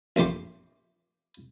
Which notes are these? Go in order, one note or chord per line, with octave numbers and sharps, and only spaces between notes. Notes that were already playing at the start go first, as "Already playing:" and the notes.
A#1 F2 A3 G4 C6